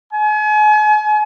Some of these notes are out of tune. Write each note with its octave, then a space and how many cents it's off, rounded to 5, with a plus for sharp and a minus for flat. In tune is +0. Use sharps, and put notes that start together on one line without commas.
G#5 +40